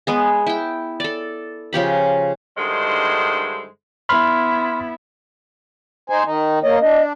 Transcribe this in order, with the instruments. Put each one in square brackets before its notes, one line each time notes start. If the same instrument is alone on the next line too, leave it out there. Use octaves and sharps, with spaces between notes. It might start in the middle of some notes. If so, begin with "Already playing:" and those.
[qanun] G#3 B3 G#4
E4 G5
A4 D5
C#3 F3 G4 B5
[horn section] G2 D3 D#3 G#3 E4 C5
[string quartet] B3 E4 [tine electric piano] B5 C6 F6
[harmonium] D#4 C5 G#5
D#3 D#4
[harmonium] A#3 D#5 [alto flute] C#5
[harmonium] D4 [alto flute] D#5